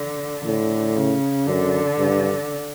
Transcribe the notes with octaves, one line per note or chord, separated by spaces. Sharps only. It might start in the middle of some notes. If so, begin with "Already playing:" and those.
Already playing: D3
A2 D3
C#3
F#2 D3
G2